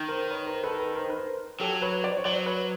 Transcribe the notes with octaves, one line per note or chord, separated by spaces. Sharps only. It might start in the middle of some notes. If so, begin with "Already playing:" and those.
Already playing: D#3
A#4 C5
B4 C#5
A#4 C5
A4 B4
A4 B4
A#4 C5
B4
A#4 C5
F#3 G4 A4
B4 C#5
C5 D5
C#5
F#3 C5 D5
B4 C#5